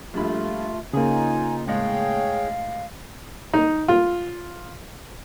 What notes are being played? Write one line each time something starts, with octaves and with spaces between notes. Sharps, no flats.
A#1 G2 A3 F4 B5
C#3 A#3 D#4 F4 G#4 G#5
A2 G#3 G#4 C#5 F5 G5
D#4
F4